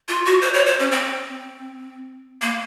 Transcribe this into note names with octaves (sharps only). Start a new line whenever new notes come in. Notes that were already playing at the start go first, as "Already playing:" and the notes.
F4
F#4
C5
C#5
C5
C#4
C4
A#3